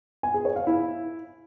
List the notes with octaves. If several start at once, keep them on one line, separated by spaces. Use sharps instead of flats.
G#5
G#4
C#5
F5
E4